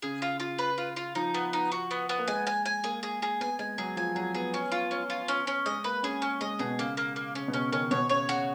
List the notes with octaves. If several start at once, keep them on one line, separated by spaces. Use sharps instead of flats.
C#3 G#4
F4
F4
B4
F4
F4
F3 D#4
B3
D#4
F#4
B3
B3
A#3
G#3 G#5
G#5
G#5
A#3 G#4
G#4
G#4
B3 G#5
G#3 G#5
F#3 G#4
F3 G#5
F#3 G#4
B3 G#4
C#4
F4
C#4
F4
C#4
C#4
G#3 D#5
A#3 B4
C#4 G#4
C#4
G#3 D#5
B2 G#4
C#3 A#3
A#3
A#3
C#3 C#4
B2
C#3 C#4
D#3 C#4
B2 C#5
C#3 C#5
C#3 F#4